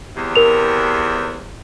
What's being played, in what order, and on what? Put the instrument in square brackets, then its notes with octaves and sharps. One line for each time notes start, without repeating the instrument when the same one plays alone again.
[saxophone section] E2 C3
[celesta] A#4 F7